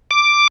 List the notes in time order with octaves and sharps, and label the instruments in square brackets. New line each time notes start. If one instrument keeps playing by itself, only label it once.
[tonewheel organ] D6